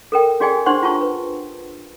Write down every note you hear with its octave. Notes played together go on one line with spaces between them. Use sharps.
A4 A#4 G5
C#4 F#4 G#4 D5 G5 G#5
D4 G4 C5 F#5 C6 C#6
F4 A5 C#6
B4